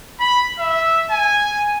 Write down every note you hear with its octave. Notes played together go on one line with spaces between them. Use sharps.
B5
E5
G#5